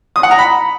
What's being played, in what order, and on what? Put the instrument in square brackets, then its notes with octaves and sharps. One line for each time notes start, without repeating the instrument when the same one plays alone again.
[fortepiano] D#6
F#5
A#5
B5